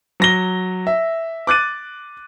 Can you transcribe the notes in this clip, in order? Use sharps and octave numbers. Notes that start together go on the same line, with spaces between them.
F#3 A#6 G7
E5
D6 F#6 A6 D#7